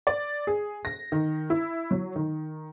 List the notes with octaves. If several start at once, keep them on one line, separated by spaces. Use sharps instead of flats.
D5
G#4
A#6
D#3
E4
F#3
D#3